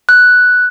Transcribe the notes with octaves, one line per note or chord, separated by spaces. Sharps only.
F#6